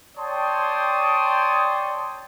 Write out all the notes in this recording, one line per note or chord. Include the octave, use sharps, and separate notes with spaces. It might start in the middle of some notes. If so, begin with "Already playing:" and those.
C#5 D5 G5 A5 C6 D#6